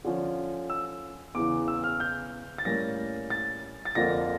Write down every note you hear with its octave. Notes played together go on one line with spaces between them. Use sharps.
D3 F3 C#4
E6
E2 C#3 E3 D6
E6
F6
G6
A6
A2 G3 A#3 C#4 A#6
A6
A6
F2 D3 F3 A#3 A#6